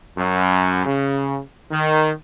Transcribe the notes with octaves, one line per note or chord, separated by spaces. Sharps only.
F#2
C#3
D#3